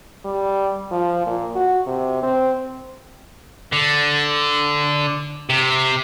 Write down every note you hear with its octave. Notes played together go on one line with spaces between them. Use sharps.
G3
F3
A#2
F#4
C3
C4
D3
C3